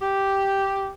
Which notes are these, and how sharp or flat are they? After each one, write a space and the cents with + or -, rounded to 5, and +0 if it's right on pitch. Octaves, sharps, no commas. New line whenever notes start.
G4 -5